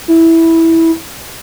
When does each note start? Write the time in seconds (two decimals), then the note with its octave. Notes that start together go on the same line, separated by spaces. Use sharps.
0.08 E4